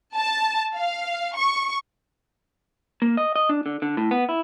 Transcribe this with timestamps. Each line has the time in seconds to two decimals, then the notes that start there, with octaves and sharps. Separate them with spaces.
0.15 A5
0.75 F5
1.36 C#6
3.02 A#3
3.17 D#5
3.36 D#5
3.49 D4
3.66 D3
3.82 D3
3.97 A2
4.11 B3
4.29 E4